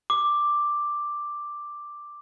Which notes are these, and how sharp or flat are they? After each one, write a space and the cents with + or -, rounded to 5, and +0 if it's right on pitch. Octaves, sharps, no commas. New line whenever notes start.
D6 +5